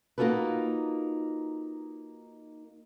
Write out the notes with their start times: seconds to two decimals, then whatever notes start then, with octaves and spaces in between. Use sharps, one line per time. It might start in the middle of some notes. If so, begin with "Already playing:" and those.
0.18 A#3 D#4 F4 F#4 A4 B4